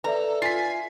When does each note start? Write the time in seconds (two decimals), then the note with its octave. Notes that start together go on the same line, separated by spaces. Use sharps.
0.04 A4 B4 D5 E5 A#5
0.42 F4 G#5 B6 C7